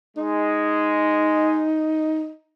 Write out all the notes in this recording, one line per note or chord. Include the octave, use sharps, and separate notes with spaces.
G#3 D#4